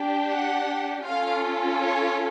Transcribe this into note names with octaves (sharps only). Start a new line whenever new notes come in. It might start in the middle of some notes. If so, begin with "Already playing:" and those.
Already playing: D4 G4
F#5
C#4 F4 A4 F5
C#5